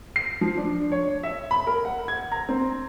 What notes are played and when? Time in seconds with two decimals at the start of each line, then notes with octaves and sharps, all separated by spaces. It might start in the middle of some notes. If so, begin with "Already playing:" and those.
0.16 C7
0.41 F3
0.57 D4
0.92 C#5
1.23 E5
1.51 B5
1.67 A#4
1.85 F#5
2.08 G#6
2.32 A#5
2.49 C4